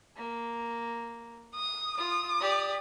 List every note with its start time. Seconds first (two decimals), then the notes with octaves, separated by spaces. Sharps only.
0.17 A#3
1.55 D#6
1.98 F4 D#6
2.41 G4 D5